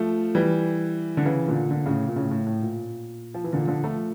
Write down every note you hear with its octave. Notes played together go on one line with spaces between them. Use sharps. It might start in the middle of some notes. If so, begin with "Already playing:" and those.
Already playing: F3 A3
E3 G3
D3
C#3 E3
A#2 D3
A#2 D3
A2 C#3
A#2
A2 C#3
A2
A2
A#2
F3
E3
A#2 D3
D3 F3
F3 A3